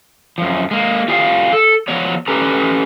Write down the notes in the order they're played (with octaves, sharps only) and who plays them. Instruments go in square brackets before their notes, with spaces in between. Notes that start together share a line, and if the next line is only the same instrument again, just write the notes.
[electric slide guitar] F#2 F3
G#3 A#3
F4 G4 G#4 F5
A4
F3 F#3 B3 C#5
C#4 G4 A4 B4 A#5